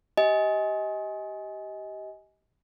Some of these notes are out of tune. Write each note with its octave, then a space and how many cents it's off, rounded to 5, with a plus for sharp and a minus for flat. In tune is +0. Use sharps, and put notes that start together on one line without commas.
G4 -20 D#5 +25 G#5 +5